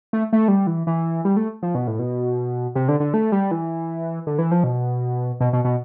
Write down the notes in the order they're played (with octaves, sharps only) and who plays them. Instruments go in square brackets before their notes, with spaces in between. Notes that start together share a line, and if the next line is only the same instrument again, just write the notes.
[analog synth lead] A3
A3
G3
E3
E3
G3
A3
F3
B2
A2
B2
C3
D3
D3
A3
G3
E3
D3
E3
F3
B2
B2
B2
B2